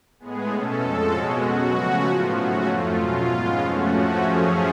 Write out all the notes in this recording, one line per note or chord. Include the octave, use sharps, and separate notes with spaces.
A2 G#3 B3 G#4
B2 A3 C#4 A4
F2 F3 G#3
B2 G#3 C#4 F#4
B2 F#3 B3
C#3 F3 A3 C#4
A2 F3 B3 F4
G#2 F#3 A3 C#4 F#4
F2 F3 A3 F4
B2 F#3 C#4
G#2 G#3 B3
F2 F3 A3 C#4 F#4
A2 F3 A3 C#4
F#2 F3 A3 C#4 G#4